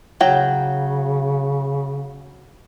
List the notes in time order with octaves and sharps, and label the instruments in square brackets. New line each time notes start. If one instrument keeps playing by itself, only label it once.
[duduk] C#3 [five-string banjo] F#3 G5